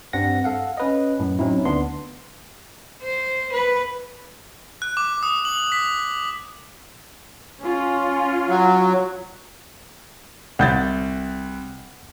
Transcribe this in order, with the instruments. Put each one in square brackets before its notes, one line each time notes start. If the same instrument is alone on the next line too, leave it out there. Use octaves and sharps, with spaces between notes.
[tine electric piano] G2 G3 C4 F#5 A#6
A4 F5 F#5
C#4 B4 D#5
F#2 A2
F#3 C4 C#4 D#4 E4
D2 B3 D4 C6
[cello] C5
B4
[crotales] F#6
D6
D#6
F#7
B6
[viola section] C#4 F4
[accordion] F#3
[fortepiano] C2 [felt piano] F#5 G6 A6